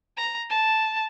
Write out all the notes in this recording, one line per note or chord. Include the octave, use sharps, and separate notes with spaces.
A#5
A5